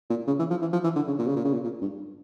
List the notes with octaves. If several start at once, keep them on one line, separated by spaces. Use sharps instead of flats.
A#2
C#3
E3
F3
E3
F3
E3
D3
C#3
A#2
C#3
A#2
C#3
A#2
A#2
G2